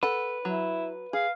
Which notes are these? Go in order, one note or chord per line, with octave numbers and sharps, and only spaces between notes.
A4 B4 F#5
F#3 E4
G#4 F5